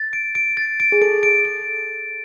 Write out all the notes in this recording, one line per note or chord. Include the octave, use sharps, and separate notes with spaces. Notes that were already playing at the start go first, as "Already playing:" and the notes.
Already playing: A6
D7
D7
A6
D7
G#4
A4 D7
D7
D7